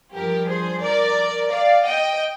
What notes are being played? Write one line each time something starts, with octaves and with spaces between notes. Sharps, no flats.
G2 F3 G4 A#4
G#4 C5
A#4 D5
D5 F5
D#5 G5